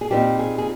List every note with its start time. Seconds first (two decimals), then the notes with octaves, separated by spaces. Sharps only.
0.01 G#4
0.11 A#2 G3 C4 D#4 G4
0.39 G#4
0.58 G#4